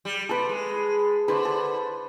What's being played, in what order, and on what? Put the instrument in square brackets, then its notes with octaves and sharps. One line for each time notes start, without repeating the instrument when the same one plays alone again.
[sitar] G3
[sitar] C3 [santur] A4 B4
[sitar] G#3
[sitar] D3 [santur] B4 C5 C#6
[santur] A4